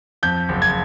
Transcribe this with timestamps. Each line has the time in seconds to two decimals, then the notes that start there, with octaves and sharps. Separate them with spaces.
0.23 F2 G6
0.49 F#1
0.62 G#6